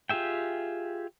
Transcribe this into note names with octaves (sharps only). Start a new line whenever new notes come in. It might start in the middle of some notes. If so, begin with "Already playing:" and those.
F4 G4 G#4 E5 G5